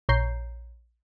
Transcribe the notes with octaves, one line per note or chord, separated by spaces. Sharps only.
A#1 C#5 A#5 G6 C7